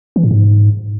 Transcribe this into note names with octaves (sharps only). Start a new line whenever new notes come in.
E3
A2
G#2